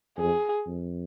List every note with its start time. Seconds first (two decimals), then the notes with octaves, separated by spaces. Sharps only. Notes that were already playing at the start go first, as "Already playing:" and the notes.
0.17 F2 G#4
0.66 F2